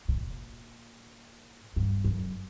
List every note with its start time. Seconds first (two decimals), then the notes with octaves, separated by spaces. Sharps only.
0.08 A#2
1.76 G2
2.04 F#2